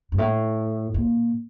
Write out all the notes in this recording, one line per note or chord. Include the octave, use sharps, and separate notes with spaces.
G2
A2
A#2